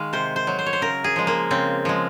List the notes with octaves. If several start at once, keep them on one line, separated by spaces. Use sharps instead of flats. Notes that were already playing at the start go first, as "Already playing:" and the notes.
Already playing: D#3 G#3 F5
C3 C5
C5
F#3
C5
C#5
C5
C#3 A#4
G#4
F3 G#3
A#3
C#3 C4
F3 G#3